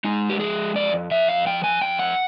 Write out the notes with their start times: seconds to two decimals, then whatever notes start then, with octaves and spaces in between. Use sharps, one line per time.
0.04 G#3 D#4
0.30 G4
0.40 F3 G#4
0.75 F2 D5
1.11 F2 E5
1.29 F5
1.46 F3 G5
1.64 G#5
1.81 F2 G5
1.99 F#5